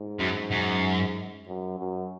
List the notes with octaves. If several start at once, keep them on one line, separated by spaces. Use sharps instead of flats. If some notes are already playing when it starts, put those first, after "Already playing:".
Already playing: G#2
F#2
F#2
F#2
F#2